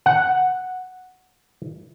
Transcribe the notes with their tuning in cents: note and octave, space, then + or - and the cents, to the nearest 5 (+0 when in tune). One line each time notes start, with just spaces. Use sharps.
F#5 +0